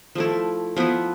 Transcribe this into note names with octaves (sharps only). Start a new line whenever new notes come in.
F3 A3 E4
F3 B3 E4